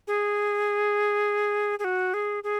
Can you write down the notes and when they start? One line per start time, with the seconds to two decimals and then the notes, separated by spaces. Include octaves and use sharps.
0.07 G#4
1.79 G#4
1.84 F#4
2.14 G#4
2.43 G#4